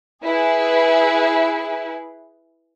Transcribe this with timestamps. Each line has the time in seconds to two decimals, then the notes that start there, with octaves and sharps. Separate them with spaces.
0.23 E4 G#4 B4